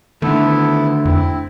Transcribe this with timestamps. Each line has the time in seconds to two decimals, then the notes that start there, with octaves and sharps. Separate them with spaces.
0.22 D3 D#3 A3 B3 E4 A4
1.05 F2 C4 E4